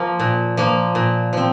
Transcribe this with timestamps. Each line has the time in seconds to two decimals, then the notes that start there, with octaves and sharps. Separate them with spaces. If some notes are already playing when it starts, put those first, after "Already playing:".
Already playing: F3 A#3
0.19 A#2
0.57 F3 A#3
0.95 A#2
1.33 F3 C4